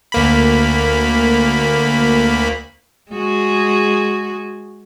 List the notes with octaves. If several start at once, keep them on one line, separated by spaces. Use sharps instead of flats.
D2 A#3 B5
G#3 F#4 G#4